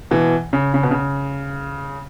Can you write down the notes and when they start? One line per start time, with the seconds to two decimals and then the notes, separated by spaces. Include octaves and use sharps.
0.11 B2 E3
0.53 C#3
0.74 C#3
0.83 B2
0.91 C#3